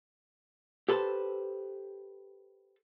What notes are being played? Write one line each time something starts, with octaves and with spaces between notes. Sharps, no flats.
G4 A4 B4 C5 A5